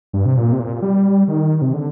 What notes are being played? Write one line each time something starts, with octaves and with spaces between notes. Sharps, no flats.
G2
C3
A#2
C3
A#2
G3
D#3
C3
D3